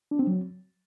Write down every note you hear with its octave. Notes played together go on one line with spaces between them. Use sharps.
D4
C4
F#3